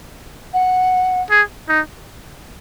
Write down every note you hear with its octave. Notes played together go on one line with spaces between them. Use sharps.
F#5
G#4
D#4